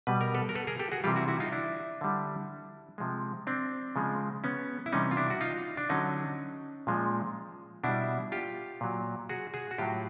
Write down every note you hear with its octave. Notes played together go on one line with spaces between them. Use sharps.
B2 G3 B4
A#4
A4 B4
A#4
A4 B4
G#4 A#4
G4 A4
F#4 G#4
C3 E3 G3 F4 G4
E4 F#4
E4 F#4
D#4 F4
D4 E4
D3 G3
C3 F3 G#3
C4 D4
C#3 F3 G#3
B3 C#4
E4
C3 E3 G3 C#4 D#4
F4
D4 E4
F#4
D#4 F4
D4
D3 F#3 C#4 D#4
A#2 F3 G#3
B2 G3 D4 E4
F4 G4
A#2 F#3
F#4 G#4
F#4 G#4
F#4
A2 F#3 F4 G4